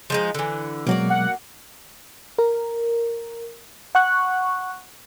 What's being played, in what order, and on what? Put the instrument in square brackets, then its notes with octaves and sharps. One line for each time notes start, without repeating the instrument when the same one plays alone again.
[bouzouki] F3 G#3 D#4
D3 E3
[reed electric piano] B2 F#3 G#3 [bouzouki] A#3 F#4 D5
[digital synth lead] F#5
[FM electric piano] A#4
F#5 C#6 F#6